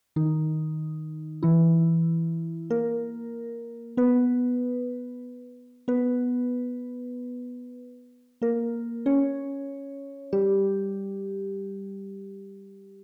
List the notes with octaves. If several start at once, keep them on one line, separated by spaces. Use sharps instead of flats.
D#3 D#4
E3 E4
A#3 A#4
B3 B4
B3 B4
A#3 A#4
C#4 C#5
G3 G4